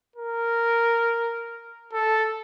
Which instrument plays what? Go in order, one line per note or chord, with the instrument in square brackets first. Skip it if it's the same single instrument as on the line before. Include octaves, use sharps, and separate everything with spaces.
[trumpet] A#4
A4